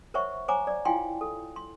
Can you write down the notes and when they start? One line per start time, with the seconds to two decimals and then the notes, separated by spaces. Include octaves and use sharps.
0.14 A#4 C5 C#5 E5 F#5 C#6
0.48 C5 C#5 F#5 G#5 A#5 D6
0.67 D5
0.85 E4 F4 F5 G5 G#5 C6
1.21 A4
1.56 C6